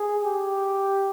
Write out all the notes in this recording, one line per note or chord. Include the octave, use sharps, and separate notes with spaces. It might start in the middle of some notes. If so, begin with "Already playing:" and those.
Already playing: G#4
G4